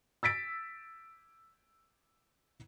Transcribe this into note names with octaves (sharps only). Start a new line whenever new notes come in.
E6 A6 B6 D7